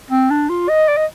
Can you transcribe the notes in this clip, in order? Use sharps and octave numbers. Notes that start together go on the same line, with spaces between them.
C4
D4
F4
D#5
D5
D#5